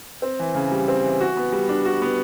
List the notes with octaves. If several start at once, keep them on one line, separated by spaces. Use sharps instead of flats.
C4
E3
C#3
G3
C4
E3
F#4
B3
G3
D4
F#4
B3